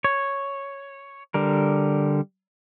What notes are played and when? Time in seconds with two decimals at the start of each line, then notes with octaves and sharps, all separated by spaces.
0.04 C#5
1.34 D3 G3 A#4